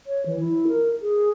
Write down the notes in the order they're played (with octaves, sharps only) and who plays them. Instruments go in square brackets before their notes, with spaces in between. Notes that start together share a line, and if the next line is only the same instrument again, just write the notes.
[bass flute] C#5
E3
E4
A#4
G#4